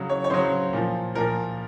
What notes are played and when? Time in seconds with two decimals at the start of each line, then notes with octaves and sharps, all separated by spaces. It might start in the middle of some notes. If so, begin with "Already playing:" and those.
Already playing: C#3 F#3
0.09 C#5
0.24 C#5
0.30 C#3 F#3 C5
0.73 A#2 F3
1.15 A#2 F3 A#4